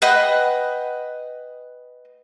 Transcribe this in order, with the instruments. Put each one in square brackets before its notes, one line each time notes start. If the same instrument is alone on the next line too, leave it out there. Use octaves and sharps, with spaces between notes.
[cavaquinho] B4 D#5 F#5 G5